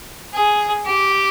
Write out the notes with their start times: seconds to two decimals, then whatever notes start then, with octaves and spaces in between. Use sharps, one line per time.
0.33 G#4
0.85 G4